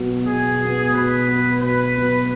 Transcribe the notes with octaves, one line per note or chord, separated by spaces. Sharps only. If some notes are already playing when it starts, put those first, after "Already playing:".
Already playing: B2 F#3 B3
B2 G#4
F#3
B3
B2 B4
F#3 B3
B2 B4
F#3 B3